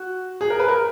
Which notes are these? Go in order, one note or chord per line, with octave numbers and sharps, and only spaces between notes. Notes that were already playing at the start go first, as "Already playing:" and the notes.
Already playing: F#4
G#4
A#4
B4
A#4